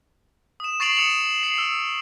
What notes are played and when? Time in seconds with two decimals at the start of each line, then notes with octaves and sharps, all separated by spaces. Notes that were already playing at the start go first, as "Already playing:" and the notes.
0.60 D#6 E7
0.80 C#6 A6 C7 D7 F7 F#7
0.97 D#6 C#7 E7 F7
1.43 C7
1.58 E6